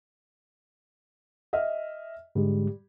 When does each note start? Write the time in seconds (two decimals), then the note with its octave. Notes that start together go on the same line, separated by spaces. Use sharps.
1.53 D#5 E5 F6
2.35 G#2 D3 G3 G#3